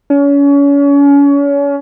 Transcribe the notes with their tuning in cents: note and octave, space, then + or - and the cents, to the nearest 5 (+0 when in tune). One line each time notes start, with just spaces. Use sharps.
C#4 +35